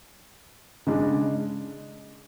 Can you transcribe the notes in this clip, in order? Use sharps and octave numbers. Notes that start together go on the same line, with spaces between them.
C#3 G#3 D4